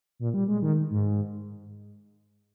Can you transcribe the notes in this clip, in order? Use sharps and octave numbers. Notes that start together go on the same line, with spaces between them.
A#2
G3
G#3
D#3
G#2